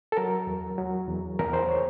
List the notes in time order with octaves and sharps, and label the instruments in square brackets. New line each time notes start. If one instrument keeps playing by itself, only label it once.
[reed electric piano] A4
F#3 A#4
E2
F#3
E2
E2 A#4
C5
C#5